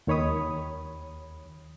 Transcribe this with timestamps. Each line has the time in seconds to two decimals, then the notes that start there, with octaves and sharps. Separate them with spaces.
0.07 D#2 D#3 C#5 B5 D#6